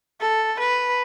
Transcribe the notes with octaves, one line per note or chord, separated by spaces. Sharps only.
A4
B4